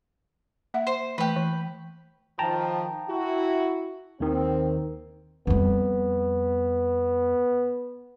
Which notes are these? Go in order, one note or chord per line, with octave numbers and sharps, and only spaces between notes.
A#3 E5 F#5
C5
E3 A3 G4 B4
E3
D#3 F3 G5 A5 A#5
E4 F#4
D#2 D#3 C4
F2 G3 B3